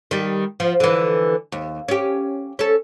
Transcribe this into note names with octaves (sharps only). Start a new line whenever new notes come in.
D#3 G3
F3
D3 E3
D#2
C#4 G4
C#4 A4